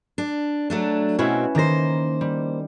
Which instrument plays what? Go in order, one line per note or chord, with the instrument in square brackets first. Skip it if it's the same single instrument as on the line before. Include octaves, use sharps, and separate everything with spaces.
[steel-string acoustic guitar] D4
F#3 A3 D4
[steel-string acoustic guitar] B2 C4 F#4 [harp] C#4 E4 B4
[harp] D#3 A#6 [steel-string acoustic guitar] A#3 C5
[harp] G3